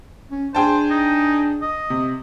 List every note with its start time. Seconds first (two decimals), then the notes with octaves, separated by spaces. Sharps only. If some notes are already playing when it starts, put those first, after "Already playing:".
0.31 C#4
0.55 D4 G#4 C5 G5 A5
0.90 D#4
1.62 D#5
1.90 C3